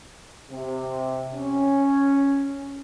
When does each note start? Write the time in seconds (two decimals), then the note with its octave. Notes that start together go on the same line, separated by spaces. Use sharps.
0.51 C3
1.34 C#4